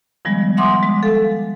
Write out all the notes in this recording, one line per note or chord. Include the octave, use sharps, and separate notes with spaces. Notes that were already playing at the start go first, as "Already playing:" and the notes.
D#3 F3 G3 G#3 B3
E5 F#5 G#5 C6 D6 D#6
G#3
A4 F5